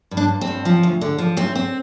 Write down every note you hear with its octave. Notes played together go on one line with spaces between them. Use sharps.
G2
D4
G2
C4
G2
F3
D2
D3
F3
D2 C4
C4